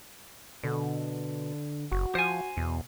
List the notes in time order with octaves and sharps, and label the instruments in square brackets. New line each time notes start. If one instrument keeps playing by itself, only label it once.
[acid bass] B2 [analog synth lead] D3
[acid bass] F#1 [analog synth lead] F#4
[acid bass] F3 [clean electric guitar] C5 G#5
[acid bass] E2 [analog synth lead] B2